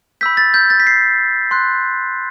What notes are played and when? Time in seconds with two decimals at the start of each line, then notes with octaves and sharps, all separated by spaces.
0.21 B5 E6 G6 B6
0.37 A6
0.54 G6
0.70 A6
0.80 B6
0.87 C7
1.51 C6 F#6